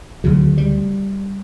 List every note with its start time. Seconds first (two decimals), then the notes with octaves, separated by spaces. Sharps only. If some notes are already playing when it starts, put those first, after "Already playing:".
0.24 D2 C#3 F#3
0.58 G3